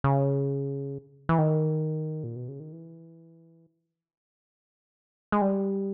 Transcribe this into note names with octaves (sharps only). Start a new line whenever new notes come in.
C#3
E3
D#3
A#2
B2
C#3
D#3
E3
G#3
G3